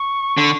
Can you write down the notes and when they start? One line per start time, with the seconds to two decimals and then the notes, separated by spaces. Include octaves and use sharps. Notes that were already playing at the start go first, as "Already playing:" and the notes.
Already playing: C#6
0.38 D3